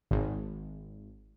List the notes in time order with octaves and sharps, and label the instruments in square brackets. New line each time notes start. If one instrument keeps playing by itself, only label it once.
[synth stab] G#1